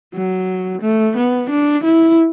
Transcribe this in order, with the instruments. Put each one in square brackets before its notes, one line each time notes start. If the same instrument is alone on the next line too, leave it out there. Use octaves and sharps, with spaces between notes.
[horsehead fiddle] F#3
A3
B3
D4
E4